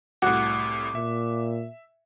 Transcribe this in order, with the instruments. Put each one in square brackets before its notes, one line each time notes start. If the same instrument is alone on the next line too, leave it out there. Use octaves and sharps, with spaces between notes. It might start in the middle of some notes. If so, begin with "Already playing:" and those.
[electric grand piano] C2 A2 [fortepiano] F#4 [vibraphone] D6
[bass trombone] A#2 [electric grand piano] E5